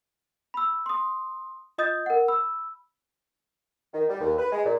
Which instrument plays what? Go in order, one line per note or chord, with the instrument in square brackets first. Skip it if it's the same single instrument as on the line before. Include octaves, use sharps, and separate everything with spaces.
[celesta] B5 E6
C6 D#6
F4 D#5 D#6 G6 A6
A#4 F#5
B5 E6
[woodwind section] D#3
G3
D#2
B4
G#3
A#2